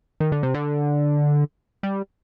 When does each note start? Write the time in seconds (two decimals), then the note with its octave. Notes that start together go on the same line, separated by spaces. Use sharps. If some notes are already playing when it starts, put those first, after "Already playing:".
0.20 D#3
0.32 D3
0.43 C3
0.54 D3
1.83 G3